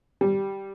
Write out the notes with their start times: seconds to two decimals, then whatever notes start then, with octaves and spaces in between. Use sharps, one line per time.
0.21 G3